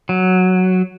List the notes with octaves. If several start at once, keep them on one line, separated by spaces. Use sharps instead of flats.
F#3